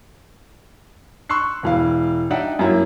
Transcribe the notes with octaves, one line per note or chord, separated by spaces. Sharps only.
C6 C#6 E6 F#6 C7
E1 E3 F5
D4 D#4 E5 F#5 G5
F#2 F#3 A#3 E4